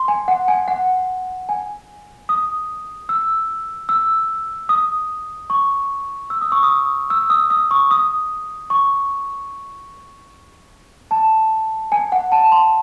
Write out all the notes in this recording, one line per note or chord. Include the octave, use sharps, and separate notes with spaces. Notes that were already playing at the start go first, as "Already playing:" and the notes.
Already playing: C6
G#5
F#5
G#5
F#5
G#5
D#6
E6
E6
D#6
C#6
E6
D#6
C#6
D#6
E6
D#6
D#6
C#6
D#6
C#6
A5
G#5
F#5
A5
C6